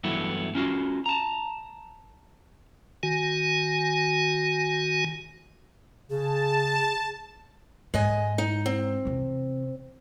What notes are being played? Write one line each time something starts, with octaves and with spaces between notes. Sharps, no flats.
G2 E3 F#3 A3 B3 E4
C#4 D#4 F4 F#4
A5 A#5
D#3 F#4 G#5
C#3 G#4 A5
G#2 G#3 D#5 G#5
D#4
C4
E2 C3